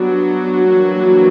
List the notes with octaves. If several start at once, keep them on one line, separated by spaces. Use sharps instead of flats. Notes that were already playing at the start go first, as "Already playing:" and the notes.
Already playing: F#3 G3 B3 D4 F#4
E3 G3 A#3 D4